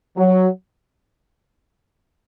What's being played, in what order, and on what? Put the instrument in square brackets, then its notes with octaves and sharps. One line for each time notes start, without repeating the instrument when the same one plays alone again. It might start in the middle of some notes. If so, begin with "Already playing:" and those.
[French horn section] F#3